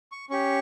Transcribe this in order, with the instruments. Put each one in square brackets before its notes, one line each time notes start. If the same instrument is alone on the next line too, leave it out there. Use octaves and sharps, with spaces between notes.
[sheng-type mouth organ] C#6
C#4 G4 C#6